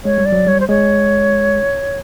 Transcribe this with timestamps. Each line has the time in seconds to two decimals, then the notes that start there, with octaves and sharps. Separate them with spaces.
0.05 G#3 C#5
0.18 G3
0.26 D5
0.32 F#3
0.46 G3 C#5
0.60 C5
0.69 G#3 C#5